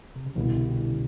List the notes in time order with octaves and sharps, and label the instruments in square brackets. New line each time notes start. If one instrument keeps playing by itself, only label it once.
[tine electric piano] C3
C#3
[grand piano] C2 B2 G3 B3 E4 [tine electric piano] D3
[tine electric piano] D3
C#3